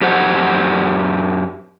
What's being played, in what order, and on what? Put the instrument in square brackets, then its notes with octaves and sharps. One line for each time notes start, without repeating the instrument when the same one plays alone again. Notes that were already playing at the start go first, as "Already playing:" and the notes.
[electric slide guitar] F#2 G4 C5 F#5